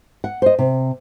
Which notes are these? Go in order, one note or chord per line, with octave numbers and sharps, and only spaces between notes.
F#5
C5 D#5
C3